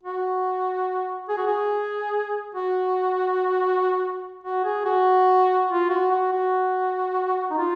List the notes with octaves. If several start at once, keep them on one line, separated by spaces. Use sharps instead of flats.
F#4
G#4
F#4
G#4
F#4
F#4
G#4
F#4
F4
F#4
F#4
F#4
D#4
F4